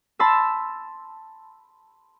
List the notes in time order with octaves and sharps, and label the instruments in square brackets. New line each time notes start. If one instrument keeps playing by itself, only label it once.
[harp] A5 B5 C6 E6